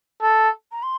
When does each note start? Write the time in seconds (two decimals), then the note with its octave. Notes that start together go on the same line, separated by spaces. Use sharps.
0.22 A4
0.72 A#5
0.83 C6